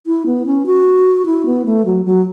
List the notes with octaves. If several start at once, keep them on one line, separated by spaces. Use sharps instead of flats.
E4
B3
C#4
F#4
E4
B3
A3
F#3
F#3